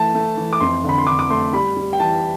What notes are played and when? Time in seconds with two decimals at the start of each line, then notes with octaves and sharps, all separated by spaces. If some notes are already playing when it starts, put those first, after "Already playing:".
Already playing: E3 A3 A5
0.15 A3
0.37 E3
0.53 D6
0.60 F2 C6
0.84 D3
0.89 B5
0.98 C6
1.07 D3 D6
1.19 D6
1.30 A3 C6
1.53 G3 B5
1.77 G3
1.93 G5
2.00 E3 A5